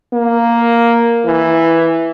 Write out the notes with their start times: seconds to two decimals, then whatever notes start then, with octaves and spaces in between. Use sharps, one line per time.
0.14 A#3
1.26 E3